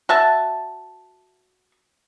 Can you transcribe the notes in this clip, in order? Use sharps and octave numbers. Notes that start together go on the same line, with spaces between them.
F#4 E5 A5